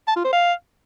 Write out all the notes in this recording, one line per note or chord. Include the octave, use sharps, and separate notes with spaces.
A5
F4
C5
F5